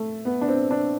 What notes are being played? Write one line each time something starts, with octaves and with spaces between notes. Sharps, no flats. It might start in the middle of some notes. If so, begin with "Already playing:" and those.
Already playing: A3
B3
D4
C4
D4